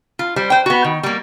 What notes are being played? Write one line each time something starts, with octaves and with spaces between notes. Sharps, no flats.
F4
G3 C5
C5 G5
B3 F#4
D#3
G3 A#3